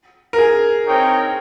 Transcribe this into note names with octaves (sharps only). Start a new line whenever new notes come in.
A#4
G#4
C4 D#4 A#4 C#5 G5